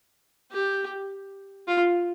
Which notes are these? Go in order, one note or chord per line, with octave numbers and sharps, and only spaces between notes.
G4
F4